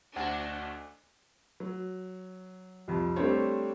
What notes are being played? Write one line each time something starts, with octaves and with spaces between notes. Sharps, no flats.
D2 A3 D4 E4 F#4 C5 D#5 F#5
F#3
C2 F2
G3 A3 C4 D4 C5 C#5